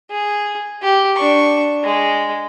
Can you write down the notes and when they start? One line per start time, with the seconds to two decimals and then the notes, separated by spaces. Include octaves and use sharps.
0.10 G#4
0.82 G4
1.16 D4 C#6
1.83 G#3